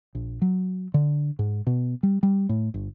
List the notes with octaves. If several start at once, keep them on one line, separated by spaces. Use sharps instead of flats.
A#1
F#3
D3
G#2
B2
G3
G3
A2
G1